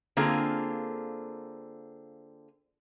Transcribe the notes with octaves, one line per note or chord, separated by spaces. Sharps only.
D3 A#3 C4 F4 G#4 A#4